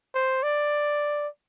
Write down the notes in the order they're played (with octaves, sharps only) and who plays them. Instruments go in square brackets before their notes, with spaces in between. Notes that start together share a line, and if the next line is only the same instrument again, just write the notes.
[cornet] C5
D5